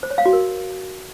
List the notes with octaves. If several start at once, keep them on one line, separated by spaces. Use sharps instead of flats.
C5
C#5
F5
F#4
A#4